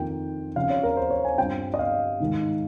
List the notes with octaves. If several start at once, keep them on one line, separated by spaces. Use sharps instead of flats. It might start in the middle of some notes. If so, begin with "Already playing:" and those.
Already playing: F2 D#3 A#3 F4 G5
C#3 F3 C4 F5
C#5
A#4
C5
C#5
G#5
G2 G3 C4 F4 G5
D#5
F5
G#2 D#3 G#3